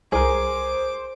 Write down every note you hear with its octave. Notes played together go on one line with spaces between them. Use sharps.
C2 G#4 A#4 C5 D6